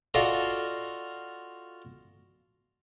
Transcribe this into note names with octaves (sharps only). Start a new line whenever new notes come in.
F4 F#4 A4 D5 D#5 F5